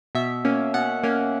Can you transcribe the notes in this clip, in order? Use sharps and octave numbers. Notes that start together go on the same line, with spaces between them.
B2 E5
A#3 C#4
B2 F#5
A#3 C#4